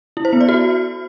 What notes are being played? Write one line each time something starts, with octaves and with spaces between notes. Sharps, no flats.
E4
C5
B3
D5
F#4